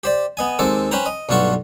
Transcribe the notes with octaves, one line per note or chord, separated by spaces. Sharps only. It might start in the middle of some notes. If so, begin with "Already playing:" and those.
G4 C5 D5
B3 D#5 G#5
D#2 G#3 C4 A4 D6
C#4 B4 C5 G5 A#5
D#5
B1 G2 A3 F4 F#4 C#6